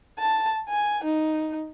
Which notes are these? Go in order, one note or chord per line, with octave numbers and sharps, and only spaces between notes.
A5
G#5
D#4